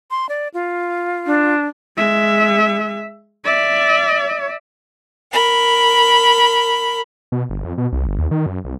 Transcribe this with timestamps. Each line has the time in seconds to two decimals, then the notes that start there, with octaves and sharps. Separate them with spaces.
0.11 C6
0.29 D5
0.54 F4
1.26 D4
1.96 G#3 E5
3.45 D5 E5
5.32 A#4 B5
7.32 B2
7.49 G1
7.65 F2
7.78 B2
7.92 C2
8.07 G1
8.18 D#2
8.31 D#3
8.46 F#2
8.64 C2